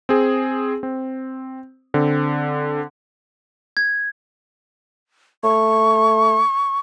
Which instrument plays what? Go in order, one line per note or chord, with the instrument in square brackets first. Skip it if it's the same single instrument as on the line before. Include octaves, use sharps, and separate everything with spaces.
[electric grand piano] C4 G#4
C4
D3 C4
[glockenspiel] G#6
[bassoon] A3 [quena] C#6